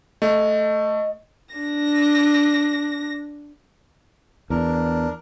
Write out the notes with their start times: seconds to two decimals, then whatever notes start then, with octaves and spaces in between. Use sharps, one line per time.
0.22 A3 D#5
1.55 D4 A#6
4.50 E2 D4 A#4